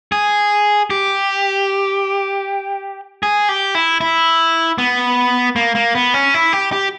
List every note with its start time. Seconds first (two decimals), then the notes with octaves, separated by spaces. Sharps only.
0.12 G#4
0.90 G4
3.23 G#4
3.49 G4
3.75 E4
4.01 E4
4.78 B3
5.56 A#3
5.75 A#3
5.95 B3
6.14 C#4
6.34 E4
6.53 G4
6.72 G4